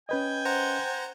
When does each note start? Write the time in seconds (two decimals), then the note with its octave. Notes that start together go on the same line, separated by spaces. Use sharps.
0.09 C#4 B4 D#5 G5 G#5
0.45 C5 F#5 A#5